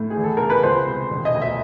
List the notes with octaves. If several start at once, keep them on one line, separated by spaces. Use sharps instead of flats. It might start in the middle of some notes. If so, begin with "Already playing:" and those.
Already playing: A2
G#4
E2
A4
C#3 A#4
B4
C#2 C5
C3
E1
D#5
D2
E5